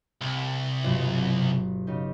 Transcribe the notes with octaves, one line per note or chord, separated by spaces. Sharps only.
C2
G1 B2 F#3
C#3 D#4 G4